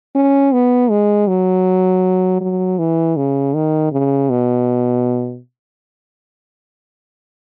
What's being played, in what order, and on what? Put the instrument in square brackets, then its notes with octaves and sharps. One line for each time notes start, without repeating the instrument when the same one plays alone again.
[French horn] C#4
B3
G#3
F#3
F#3
E3
C#3
D#3
C#3
B2